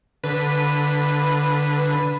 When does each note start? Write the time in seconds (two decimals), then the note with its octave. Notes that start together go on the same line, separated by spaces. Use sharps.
0.24 D3 B4